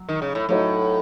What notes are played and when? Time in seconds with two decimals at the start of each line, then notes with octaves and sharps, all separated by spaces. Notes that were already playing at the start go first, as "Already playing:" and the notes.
Already playing: F#3
0.09 D#3
0.22 C#3
0.35 A2
0.49 A2 F#3 A3 D#4 F#4 C#5